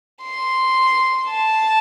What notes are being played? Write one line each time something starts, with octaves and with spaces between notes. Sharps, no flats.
C6
A5